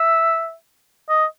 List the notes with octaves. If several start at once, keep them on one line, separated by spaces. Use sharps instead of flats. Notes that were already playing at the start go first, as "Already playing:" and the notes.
Already playing: E5
D#5